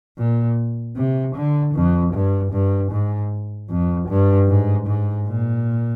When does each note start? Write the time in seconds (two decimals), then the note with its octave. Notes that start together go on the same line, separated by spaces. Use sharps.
0.18 A#2
0.96 C3
1.35 D3
1.75 F2
2.13 G2
2.52 G2
2.92 G#2
3.70 F2
4.09 G2
4.48 G#2
4.87 G#2
5.27 A#2